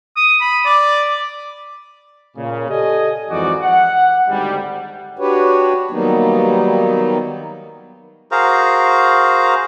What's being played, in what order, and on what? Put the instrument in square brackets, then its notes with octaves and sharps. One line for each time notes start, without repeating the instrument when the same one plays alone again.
[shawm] D#6
B5
D5
[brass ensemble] A#2 C#3
G4 A4 D5 D#5 G#5
F2 G#2 E3 D#4 F#4 D5
F#5
G#1 D2 G#2 G3
[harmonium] D4 F#4 G4 B4 C#5
D#3 F#3 G3 A#3 B3 D#4
[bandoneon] F#4 G#4 A#4 C5 F5 A#5